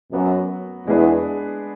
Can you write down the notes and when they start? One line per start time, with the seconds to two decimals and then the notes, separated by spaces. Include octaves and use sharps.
0.12 F#2 F#3 B3 F#4
0.87 E2 G#3 B3 D4 G#4 B4